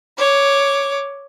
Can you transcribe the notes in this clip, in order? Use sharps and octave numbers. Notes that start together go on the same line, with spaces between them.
C#5 D6